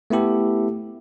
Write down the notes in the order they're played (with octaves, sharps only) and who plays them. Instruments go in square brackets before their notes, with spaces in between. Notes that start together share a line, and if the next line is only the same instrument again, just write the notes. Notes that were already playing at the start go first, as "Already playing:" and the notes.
[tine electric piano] A3 B3 E4 G4 A4